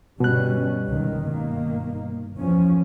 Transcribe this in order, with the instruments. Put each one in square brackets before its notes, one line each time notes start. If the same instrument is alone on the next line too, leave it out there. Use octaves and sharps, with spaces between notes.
[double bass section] G1 G3 C#4 [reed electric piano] B2 F#6
[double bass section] C#2 D#3
G1 D#3 A#3
E2 F3 C#4